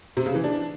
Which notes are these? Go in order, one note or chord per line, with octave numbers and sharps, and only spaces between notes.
C3
C#3
E3
D4